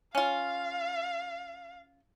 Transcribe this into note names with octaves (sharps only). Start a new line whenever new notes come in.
C#4 F4 F5